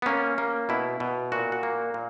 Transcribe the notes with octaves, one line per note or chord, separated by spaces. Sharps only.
B3
A#3 C#4
A#3
B2 E4
B2
A#2 F#4
F#4
A#3
A#2